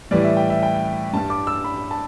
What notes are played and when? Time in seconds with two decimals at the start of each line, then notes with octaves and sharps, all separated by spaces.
0.11 A2 E3 G3 D5
0.24 E5
0.37 G5
0.50 E5
0.63 G5
1.13 G2 G3 A5
1.30 D6
1.47 E6
1.64 B5
1.91 A5